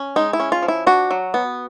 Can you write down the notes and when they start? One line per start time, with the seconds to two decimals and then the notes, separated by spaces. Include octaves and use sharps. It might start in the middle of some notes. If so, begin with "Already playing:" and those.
Already playing: C#4
0.16 G#3 D#4
0.33 E4
0.40 C#4
0.52 F4
0.63 F3
0.68 E4
0.87 D4 F#4
1.11 F#3
1.34 B3